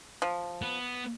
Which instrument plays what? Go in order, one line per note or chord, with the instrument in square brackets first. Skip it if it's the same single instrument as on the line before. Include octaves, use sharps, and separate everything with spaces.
[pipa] F3
[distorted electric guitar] B3